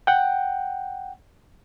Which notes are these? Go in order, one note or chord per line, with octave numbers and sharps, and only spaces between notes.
F#5 G5